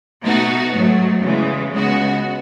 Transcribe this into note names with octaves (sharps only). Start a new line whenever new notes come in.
B2 A3 D#4 F#4
G#2 F#3 A3
E2 C#3 E3 G#3
C#2 C#3 G#3 B3 F#4